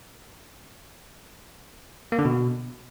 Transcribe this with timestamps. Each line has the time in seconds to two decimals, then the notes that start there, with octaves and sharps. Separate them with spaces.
2.12 A#3
2.19 D3
2.25 B2